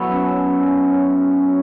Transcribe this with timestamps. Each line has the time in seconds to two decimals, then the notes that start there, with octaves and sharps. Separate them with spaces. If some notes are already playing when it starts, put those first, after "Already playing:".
Already playing: F#3 B3 E4 A4 C#5
0.11 C#4